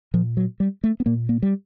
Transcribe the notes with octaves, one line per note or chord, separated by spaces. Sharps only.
A#2 F3
F#3
G3
A3
B3
A#2 A#3
A#3
G3